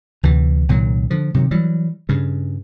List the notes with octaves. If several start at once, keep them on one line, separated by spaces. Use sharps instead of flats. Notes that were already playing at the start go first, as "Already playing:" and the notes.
D2 C3 E3
C2 A#2 D#3 F#3
D3 F3
C3 D#3 F#3
E3 F#3 G3
G2 C#3